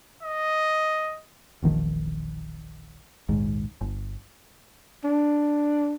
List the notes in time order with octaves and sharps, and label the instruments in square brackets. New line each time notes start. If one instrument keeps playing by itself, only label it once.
[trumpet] D#5
[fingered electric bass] E1 A#1 D#3 F3
A#1 D#2 G#2
G1
[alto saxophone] D4